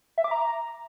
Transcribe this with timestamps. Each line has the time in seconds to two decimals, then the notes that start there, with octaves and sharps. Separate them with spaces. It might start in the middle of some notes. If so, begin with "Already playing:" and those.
0.18 E5
0.24 D6
0.31 A#5